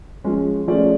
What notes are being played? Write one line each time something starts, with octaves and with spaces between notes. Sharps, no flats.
F3 G#3 C#4
F3 A3 C#4 G#4 D5